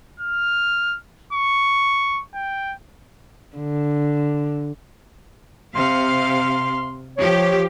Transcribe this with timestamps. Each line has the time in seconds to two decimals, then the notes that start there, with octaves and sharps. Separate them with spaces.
0.20 F6
1.33 C#6
2.35 G5
3.57 D3
5.75 C3 F5 C6
7.17 F3 G4 C#5